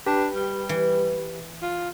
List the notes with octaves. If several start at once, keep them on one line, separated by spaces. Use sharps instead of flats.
D4 G4 B4 B5
G3
E3
F4